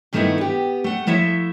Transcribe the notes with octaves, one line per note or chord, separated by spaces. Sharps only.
G2 D#3 A3 B3 D#4 E4
B3 G4
A3 F#5
F3 A3 E4 E5